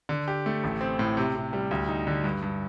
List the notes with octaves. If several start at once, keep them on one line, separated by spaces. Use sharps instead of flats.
D3
G4
A3
A1
C4
A2
C3
C3
G3
D2
D#4
D3
G2
G2